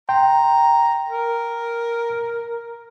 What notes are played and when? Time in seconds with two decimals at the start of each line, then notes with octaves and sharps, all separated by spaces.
0.09 G5 A#5 C6
1.09 A#4